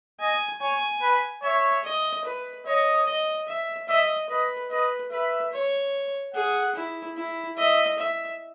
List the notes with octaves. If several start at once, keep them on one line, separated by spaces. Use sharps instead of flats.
D#5 G#5
C#5 G#5
B4
C#5 E5
D#5
B4
C#5 D#5
D#5
E5
D#5 E5
B4 D#5
B4 D#5
B4 E5
C#5
G#4 F#5
E4
E4
D#5 E5
E5